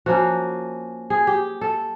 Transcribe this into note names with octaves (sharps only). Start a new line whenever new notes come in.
F3 A#3 C#4 F#4
G#4
G4
A4